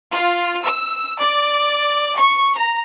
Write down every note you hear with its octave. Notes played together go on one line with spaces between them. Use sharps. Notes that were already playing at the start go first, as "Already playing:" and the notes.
F4
E6
D5
C#6
A#5